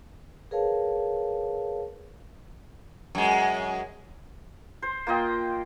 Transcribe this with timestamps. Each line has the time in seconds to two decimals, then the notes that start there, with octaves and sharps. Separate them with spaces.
0.51 G#4 A#4 B4 C#5 F5 A5
3.15 F#2 G#3
4.82 C5
5.07 A#3 F4 D#5 G5